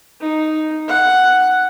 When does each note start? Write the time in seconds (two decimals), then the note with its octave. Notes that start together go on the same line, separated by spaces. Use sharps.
0.21 D#4
0.88 F#5